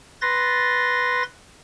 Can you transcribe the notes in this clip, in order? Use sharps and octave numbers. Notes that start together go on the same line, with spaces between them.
B4 C6 A6 A#6